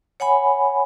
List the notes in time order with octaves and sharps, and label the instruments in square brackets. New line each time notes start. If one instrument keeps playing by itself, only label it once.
[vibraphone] C#5 F#5 G#5 B5